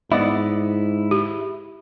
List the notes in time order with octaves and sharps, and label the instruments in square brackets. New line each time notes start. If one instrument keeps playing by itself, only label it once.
[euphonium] G#2 [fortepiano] B3 D5 D#5 [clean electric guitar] E4
[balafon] G4